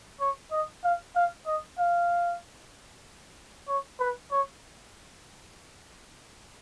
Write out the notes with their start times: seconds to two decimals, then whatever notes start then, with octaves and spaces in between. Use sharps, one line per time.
0.20 C#5
0.52 D#5
0.84 F5
1.16 F5
1.47 D#5
1.79 F5
3.68 C#5
4.00 B4
4.31 C#5